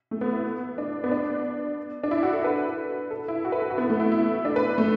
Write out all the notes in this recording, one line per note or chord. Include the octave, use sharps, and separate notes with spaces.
A3
B3
E4
D4
B3
D4
D4
E4
F#4
A4
B4
A4
E4
F#4
B4
A4
F#4
B3
A3
E4
E4
D4
B4
A3